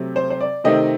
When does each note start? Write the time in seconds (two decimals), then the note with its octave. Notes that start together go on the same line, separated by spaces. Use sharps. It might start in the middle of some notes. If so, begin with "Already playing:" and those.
Already playing: C3 F#3 A3 C4
0.16 C5
0.30 C5
0.41 D5
0.64 C3 D#3 A3 C4 D#5